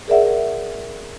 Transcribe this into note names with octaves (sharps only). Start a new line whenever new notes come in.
G#4 A#4 D5 E5 F#5